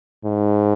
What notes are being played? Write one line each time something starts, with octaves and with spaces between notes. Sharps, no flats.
G#2